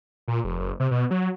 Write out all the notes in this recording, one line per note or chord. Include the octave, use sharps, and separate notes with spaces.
A#2
F1
F#1
C3
B2
F#3